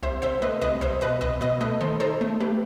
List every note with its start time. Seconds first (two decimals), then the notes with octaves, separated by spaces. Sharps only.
0.02 C2 C5 E5
0.22 C2 C5 E5
0.42 A3 B4 D#5
0.61 C2 B4 D#5
0.81 C2 C5 E5
1.01 B2 B4 D#5
1.21 C2 B4 D#5
1.41 B2 B4 D#5
1.61 A3 B4 D#5
1.81 D#3 A4 C5
2.00 D#4 A4 C5
2.21 A3
2.40 A3 G4 B4